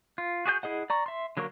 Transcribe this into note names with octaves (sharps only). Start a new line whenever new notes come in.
F4
F#4 G#4 D5 G6
E4 G#4 D#5 F#5
D5 A#5 C#6
E5 C6
D3 F#3 A#3 A#4 C#6